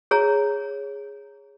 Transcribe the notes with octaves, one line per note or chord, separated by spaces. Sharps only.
G#4 C#5 A#5